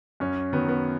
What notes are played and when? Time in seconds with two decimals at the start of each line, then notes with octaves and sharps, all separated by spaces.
0.20 F#2 C#4
0.53 D#3 F#3 B3
0.69 B3